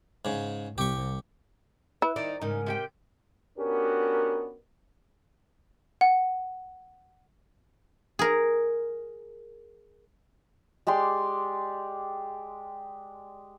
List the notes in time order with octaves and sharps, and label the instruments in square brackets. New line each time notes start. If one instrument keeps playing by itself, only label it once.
[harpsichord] G#2 C#3
[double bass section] C2 [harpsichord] G4 C#6
[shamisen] E4 [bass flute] B4
[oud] D#3 D#4 [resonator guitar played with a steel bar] D5 [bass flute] D#5
[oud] G#2 C#3 [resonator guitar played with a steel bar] D#4 [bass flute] A#4
[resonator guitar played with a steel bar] C3 G4 G5
[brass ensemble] B3 C#4 D4 F#4 G4 A#4
[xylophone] F#5
[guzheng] G#4 A#4
[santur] G#3 G4 D5 C6